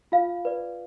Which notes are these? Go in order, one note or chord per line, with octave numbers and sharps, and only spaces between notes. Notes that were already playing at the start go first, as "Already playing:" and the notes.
F4 F5
B4 D5